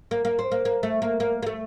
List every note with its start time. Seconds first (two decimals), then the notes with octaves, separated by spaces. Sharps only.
0.11 A#3
0.25 A#3
0.39 C4
0.52 A#3
0.65 A#3
0.83 A3
1.02 A#3
1.20 A#3
1.43 A#3
1.46 A3